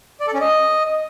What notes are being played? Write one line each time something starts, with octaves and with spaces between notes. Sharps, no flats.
D5
A4
C#4
D#5